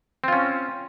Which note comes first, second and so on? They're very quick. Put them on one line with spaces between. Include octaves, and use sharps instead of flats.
C4 F4 C#4